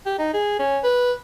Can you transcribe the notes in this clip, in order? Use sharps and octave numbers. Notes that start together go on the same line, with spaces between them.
G4
D#4
G#4
C#4
B4